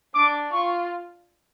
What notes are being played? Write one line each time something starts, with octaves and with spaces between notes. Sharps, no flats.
D4 D6
F4 C#6